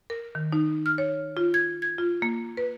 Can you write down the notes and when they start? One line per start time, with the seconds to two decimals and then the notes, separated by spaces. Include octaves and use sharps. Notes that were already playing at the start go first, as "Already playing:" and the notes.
0.10 A#4
0.35 D#3
0.53 D#4
0.86 F6
0.98 C#5
1.37 F4
1.54 G#6
1.82 G#6
1.98 F4
2.22 A#3
2.57 B4